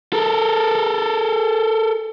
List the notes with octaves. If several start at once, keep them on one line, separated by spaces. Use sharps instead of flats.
A4 A#4